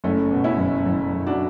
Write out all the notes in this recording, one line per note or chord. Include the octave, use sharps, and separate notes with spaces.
F#1 A3 C#4
B2
C#4 E4
F#1
F#1
F#1
D4 F#4